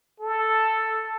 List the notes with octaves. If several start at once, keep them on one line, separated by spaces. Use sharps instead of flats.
A4